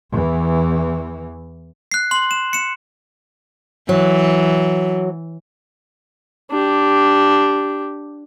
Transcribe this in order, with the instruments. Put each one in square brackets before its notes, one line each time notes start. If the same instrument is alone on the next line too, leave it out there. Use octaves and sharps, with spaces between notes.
[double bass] E2 E3
[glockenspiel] F#6 C7
C6 F#7
E7
C#7 E7
[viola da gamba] E3 [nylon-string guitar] F#3
[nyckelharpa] D4 G4